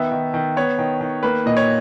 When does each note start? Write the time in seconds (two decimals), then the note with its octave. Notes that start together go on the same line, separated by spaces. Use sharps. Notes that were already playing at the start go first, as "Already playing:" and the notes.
Already playing: D#3 B3 E5
0.11 D#3
0.34 D#3
0.57 B3 C#5
0.79 D#3
1.01 D#3
1.23 A#3 B4
1.46 A#2 D#5
1.57 C#5